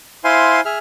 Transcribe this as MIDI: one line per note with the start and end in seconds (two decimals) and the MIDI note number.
0.24 0.61 64
0.24 0.61 72
0.24 0.61 77
0.24 0.61 80
0.24 0.61 84
0.65 0.78 68
0.65 0.78 76
0.65 0.78 89